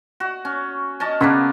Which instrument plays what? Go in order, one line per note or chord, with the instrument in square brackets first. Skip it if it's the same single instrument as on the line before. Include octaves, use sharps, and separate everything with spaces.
[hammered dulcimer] F#4
C#4
C#4 D#5 A5
[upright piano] C#3 C#6 B6 [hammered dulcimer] A#3 B3 D4